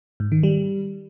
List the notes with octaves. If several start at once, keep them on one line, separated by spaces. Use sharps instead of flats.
G#2
D#3
G3